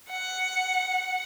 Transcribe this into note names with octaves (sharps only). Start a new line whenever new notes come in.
F#5